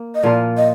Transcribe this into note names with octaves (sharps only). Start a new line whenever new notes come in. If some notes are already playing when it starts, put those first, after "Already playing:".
Already playing: A#3
D#5
A#2 F3 A#3 F4 D5
D#5